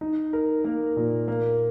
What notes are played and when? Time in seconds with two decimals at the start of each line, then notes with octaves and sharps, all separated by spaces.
0.01 D#4
0.33 A#4
0.64 A#3
0.96 A#2
1.28 A#3